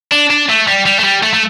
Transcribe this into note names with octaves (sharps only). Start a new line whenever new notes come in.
D4
D4
A3
G3
G3
A3
G3
A3
A3